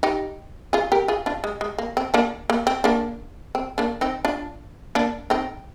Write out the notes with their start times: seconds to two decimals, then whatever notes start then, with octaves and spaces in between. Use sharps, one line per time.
0.03 D#4 G4
0.73 F4 G#4
0.92 G4 A#4
1.08 F4 G#4
1.26 D4 F4
1.44 G#3
1.61 G#3
1.78 A#3
1.97 C4
2.14 A#3 D4
2.50 A#3
2.67 C4
2.84 A#3 D4
3.55 C4
3.78 A#3 D4
4.01 C4 D#4
4.25 D4 F4
4.95 A#3 D4
5.30 C4 D#4